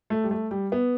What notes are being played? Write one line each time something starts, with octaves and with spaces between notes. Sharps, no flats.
A3
G3
A3
G3
B3